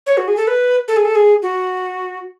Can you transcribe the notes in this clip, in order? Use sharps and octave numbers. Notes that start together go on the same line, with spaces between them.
C#5
F#4
G#4
A4
B4
A4
G#4
A4
G#4
F#4